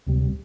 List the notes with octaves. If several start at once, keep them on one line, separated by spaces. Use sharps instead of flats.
D2 C3 G3